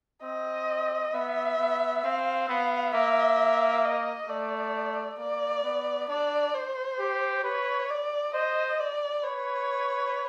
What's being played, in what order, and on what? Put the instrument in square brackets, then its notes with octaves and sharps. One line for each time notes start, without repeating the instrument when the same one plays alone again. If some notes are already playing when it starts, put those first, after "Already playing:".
[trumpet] C4 [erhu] D#5
[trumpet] B3 [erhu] E5
[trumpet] B3
[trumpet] C4 [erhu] F5
[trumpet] B3 [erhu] F5
[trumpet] A#3 [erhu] E5
[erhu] D#5
[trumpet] A3 [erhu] D5
[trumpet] A#3 [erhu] D5
[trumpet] B3
[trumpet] D4 [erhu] D5
[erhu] C5
[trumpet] G4
[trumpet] B4 [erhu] C#5
[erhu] D5
[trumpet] C5 [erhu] D#5
[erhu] D5
[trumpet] B4 [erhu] C#5